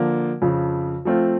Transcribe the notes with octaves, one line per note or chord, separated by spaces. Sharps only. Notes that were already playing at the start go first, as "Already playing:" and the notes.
Already playing: D3 F3 A#3
F2 C#3 F3
F3 A3 C4 F4